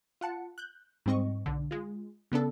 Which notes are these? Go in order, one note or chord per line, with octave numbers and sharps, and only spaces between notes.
F4 F#5 A5 C#7
F#6 G6
G#2 G3 C4 D#5 C#6
B1 D3
G#3 F4
C#3 B3 D4 A4